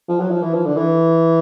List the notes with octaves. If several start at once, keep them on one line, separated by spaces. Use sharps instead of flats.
F3
F#3
F3
E3
F3
D3
E3